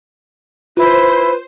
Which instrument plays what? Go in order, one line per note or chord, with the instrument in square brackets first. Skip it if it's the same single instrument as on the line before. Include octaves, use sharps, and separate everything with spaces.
[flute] E4 [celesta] F4 [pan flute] B4 [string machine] C5